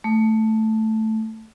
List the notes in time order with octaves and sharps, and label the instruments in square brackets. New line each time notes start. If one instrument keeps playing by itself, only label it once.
[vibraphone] A3